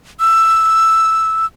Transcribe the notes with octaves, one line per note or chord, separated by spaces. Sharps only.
E6